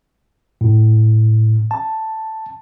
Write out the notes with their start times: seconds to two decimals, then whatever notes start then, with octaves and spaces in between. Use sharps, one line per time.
0.61 A2
1.71 A5